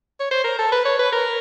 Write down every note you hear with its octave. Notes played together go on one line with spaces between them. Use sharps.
C#5
C5
A#4
A4
B4
C#5
B4
A#4